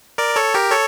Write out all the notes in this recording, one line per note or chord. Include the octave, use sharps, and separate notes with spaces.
A#4 D5
A4 C#5
G4 A#4
A4 C#5